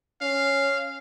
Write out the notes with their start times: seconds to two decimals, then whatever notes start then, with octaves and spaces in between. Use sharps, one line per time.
0.21 C#4 F5